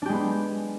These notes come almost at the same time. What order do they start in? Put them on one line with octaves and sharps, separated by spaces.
D4 G4 G#3 B3